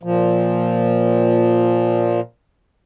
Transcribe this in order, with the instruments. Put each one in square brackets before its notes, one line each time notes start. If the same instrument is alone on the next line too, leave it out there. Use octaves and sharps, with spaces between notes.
[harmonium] A#2 F3